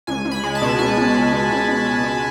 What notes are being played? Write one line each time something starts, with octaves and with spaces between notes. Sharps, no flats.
C#2 G#5
C#2
B5
G#3
A5
B2
C#2 G#5
C#2
G#3
B2
C#2
C#2
G#3
B2